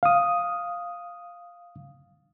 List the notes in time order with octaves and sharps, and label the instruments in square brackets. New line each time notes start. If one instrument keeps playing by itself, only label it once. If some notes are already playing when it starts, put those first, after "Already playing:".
[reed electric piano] F5 D#6